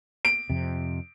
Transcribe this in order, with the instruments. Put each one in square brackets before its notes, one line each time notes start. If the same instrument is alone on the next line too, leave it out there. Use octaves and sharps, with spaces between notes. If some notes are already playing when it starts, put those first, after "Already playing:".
[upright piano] D7
[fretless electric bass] F2 C3